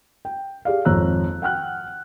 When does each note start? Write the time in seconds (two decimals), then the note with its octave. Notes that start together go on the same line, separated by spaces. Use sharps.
0.25 G5
0.65 G4 G#4 D5 F5
0.85 G#1 F2 C#5 A#5 E6 F#6
1.42 F#5 G5 F6 F#6